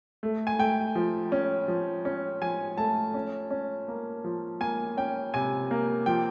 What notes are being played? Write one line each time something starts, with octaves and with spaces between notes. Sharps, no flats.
A3
G#5
A3 G5
F3
C#4
F3
C#4
F3 G#5
A3 A5
C#4
C#4
A#3
F3
A#3 G#5
C#4 G5
C3 G#5
A#3
F3 G5